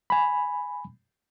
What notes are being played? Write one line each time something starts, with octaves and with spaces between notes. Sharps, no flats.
G#5 B5